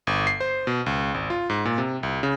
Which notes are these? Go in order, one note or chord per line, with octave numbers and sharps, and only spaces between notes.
G1
C7
C5
B2
C#2
G#1
F4
G#2
A#2
C3
C2
C#3